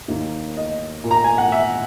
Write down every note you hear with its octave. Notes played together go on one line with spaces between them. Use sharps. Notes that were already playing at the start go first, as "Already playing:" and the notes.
D#2 D#3 A#3
D#5
A#2 A#3
A#5
G#5
F#5
E5